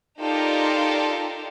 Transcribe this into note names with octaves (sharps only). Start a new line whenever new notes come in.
D#4 F4 G4 A4 A#4 D5